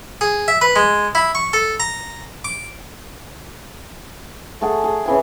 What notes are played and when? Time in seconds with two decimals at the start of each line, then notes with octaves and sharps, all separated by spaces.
0.21 G#4
0.48 E5
0.61 B4
0.76 G#3
1.15 E4
1.35 C#6
1.53 A4
1.80 A#5
2.44 D6
4.61 A3 G#4 F#5
4.84 G#4
5.06 C#3 E3 G#5